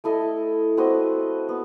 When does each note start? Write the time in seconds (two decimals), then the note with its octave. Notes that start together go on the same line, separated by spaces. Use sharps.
0.04 A3 E4 A4 D#5
0.77 C4 F#4 B4 D#5
1.49 B3